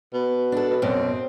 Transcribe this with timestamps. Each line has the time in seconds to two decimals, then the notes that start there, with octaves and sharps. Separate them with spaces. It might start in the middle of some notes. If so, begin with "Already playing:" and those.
0.13 B2
0.52 D4 A4
0.70 B2
0.82 F#2 B2 C4